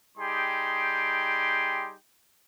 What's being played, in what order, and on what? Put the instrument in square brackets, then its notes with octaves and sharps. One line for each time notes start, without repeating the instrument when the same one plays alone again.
[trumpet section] G3 D#4 G4 G#4 G5 C6